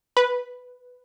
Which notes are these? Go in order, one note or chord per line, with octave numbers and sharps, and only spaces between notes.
B4